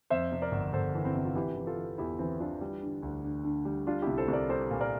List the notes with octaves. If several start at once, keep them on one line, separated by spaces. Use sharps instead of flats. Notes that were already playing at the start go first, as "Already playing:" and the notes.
F2 C5 E5
C3
A#4 D5
G1
G1 A4 C5
E3
C4 E4
C3
F4
E3 E4 G4
E3
F4 A4
E3
E2 E4 G4
E3 C4 E4
E3 D4 F4
G3
D3
D2
D3
D3
G3
G3 D4 F4
C2 E4 G4
A4 C5
C2
A#4 D5
G3 A4 C5
A#2
A#4 D5